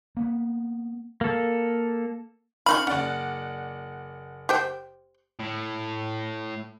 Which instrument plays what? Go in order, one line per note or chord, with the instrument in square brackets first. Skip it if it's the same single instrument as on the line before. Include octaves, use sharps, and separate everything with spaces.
[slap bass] A#3 B3
[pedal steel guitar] A#3 A4
[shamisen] C#4 D#4 F4 [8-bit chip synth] B5 [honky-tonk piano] C#6 F6
[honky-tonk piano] F#1 D5 F#5 [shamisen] C#4
[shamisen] G4 C5 G5
[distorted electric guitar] A2